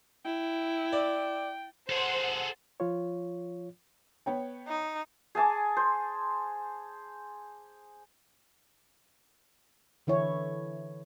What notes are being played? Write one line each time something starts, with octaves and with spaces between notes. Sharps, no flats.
E4 G5
D5
G#4 A4 C5 F#5
F3 F4 C#5
B3 C#5 G5
D#4
G#4 G#5 A5 D6
C5
D3 E3 E4 C#5